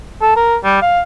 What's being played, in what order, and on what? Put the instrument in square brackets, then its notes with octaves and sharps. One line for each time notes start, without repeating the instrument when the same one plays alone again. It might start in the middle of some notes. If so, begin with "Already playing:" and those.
[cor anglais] A4
A#4
G3
F5